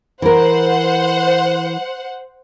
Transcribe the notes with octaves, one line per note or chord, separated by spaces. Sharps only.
E3 A#4 C5 F#5